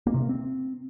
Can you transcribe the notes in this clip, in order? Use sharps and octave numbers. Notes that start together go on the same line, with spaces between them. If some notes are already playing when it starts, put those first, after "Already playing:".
A#3
C3
A#3
C4